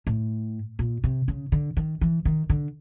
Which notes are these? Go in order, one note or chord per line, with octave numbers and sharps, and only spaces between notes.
A2
A#2
C3
C#3
D3
D#3
E3
D#3
D3